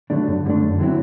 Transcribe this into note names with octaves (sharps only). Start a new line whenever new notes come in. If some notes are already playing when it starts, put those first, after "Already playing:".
D3 F#3 A3 D4
G2
D3 F#3 A3 D4
F#2
D3 F#3 C4 E4